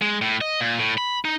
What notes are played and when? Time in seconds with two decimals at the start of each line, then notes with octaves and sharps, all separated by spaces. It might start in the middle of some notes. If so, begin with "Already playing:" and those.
0.02 G#3
0.21 A2
0.41 D#5
0.60 A#2
0.79 A2
0.98 B5
1.25 D#4